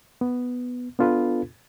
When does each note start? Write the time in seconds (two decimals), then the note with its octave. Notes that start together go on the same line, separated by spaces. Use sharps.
0.21 B3
0.99 B3 D4 F4 A4 B4